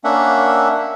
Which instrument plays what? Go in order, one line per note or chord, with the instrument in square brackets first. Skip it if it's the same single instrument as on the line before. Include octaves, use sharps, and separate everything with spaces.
[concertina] A#3 C#4 D4 E5 F#5